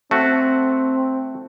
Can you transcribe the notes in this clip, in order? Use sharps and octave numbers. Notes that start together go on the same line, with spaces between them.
A3 C4 F#4